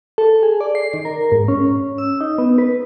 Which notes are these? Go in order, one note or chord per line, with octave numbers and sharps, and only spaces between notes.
A4
G#4
D5
C7
D#3
A#4
G#2
C#4
E6
D#4
B3
B4